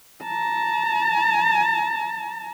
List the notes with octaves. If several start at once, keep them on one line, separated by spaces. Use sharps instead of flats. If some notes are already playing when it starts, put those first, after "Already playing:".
A5 A#5